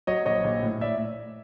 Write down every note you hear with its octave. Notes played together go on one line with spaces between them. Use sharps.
F#3 C#5 D#5
A#1 C#5 D#5
A#1
A2
A2 D5 E5